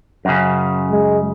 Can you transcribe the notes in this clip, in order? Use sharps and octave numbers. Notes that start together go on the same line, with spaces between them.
F#2 C#3
G#3